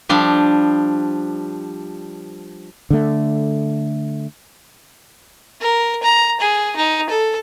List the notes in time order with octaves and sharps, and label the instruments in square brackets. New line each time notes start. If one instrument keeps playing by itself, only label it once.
[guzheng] F3 G3 D4
[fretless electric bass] D3 A3
[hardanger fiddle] A#4
A#5
G#4
D#4
A4